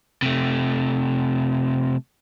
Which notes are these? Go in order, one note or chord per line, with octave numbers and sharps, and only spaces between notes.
C3 A3